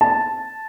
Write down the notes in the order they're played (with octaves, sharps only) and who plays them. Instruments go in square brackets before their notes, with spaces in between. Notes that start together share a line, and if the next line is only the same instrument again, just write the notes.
[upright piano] A5